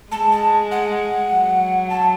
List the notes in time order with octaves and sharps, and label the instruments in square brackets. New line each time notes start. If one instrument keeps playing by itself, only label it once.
[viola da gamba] G#3 [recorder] A5
[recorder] A5
F#5
[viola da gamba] F#3
[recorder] A5